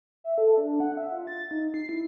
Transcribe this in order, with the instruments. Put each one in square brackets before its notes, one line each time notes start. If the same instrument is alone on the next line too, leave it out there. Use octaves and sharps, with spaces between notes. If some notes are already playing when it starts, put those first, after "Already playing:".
[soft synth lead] E5
A4
D4
F#5
E5
F4
A6
D#4
C7
E4